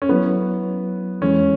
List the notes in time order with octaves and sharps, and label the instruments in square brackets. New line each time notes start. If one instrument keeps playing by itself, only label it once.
[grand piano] C#4
[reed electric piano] F#3 E4 C#5 [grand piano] B3
[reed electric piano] E2 E3 G#3 [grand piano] C#4